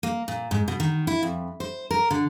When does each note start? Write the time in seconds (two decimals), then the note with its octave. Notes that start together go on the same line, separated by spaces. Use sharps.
0.03 A#3
0.28 A#2
0.51 G#2
0.68 B2
0.80 D#3
1.07 E4
1.23 F2
1.60 C5
1.91 A#4
2.11 D3